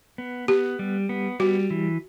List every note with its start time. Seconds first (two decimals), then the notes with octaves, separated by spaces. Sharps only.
0.18 B3
0.48 B3 G4
0.79 G3
1.09 B3
1.40 G3 F#4
1.70 E3